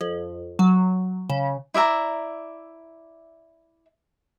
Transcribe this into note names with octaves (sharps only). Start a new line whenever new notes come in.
F2
F#3
C#3
E4 D5 E5 A#5